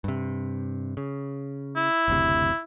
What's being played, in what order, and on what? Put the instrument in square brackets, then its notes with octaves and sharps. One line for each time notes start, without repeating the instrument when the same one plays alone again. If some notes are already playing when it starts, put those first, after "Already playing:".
[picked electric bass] G2 C3
C#3
[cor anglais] E4
[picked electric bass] F#1 D2 C3